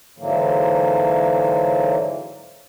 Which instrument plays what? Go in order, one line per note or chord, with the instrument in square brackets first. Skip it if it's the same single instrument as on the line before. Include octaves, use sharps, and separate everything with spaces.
[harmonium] G#2 D3 E3 F#3 A#3